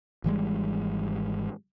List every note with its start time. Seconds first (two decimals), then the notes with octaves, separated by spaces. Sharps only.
0.24 G#1 E3 G3 G#3